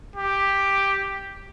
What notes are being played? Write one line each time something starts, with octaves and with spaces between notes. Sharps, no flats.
G4